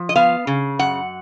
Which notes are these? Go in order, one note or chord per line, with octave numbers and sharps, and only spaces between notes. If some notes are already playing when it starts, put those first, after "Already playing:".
Already playing: F3
D#5
B3 F5
C#3
F#2 F#5